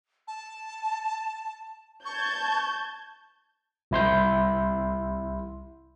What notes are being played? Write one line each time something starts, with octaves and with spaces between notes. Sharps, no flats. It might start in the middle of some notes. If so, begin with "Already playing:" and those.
A5
A5 C#6 G6 G#6
C2 E4 C6 G6